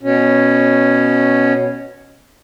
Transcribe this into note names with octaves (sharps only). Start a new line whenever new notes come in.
B2 C#4